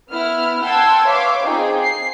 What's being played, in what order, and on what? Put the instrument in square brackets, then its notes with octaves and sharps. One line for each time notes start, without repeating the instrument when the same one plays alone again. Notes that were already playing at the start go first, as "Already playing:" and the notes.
[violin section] B3 E4 F6
F#5 G5 A5 C6 E6 G#6
B4 C#5 E5 F5 C6 D6
C4 D#4 F4 G#4 G5
C7